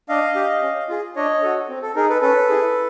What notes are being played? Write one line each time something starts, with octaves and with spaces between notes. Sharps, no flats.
D4 D#5 F5
G4
C#4
F4 G#4
D4 C#5 D#5
F#4 A4
C4
A4
D#4 G#4 A#4
A4 B4
C#4 A4 B4
E4 G#4